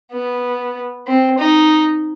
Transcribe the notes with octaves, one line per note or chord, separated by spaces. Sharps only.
B3
C4
D#4